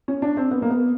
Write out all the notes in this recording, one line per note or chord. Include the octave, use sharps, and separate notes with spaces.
C#4
D4
C4
B3
A#3
B3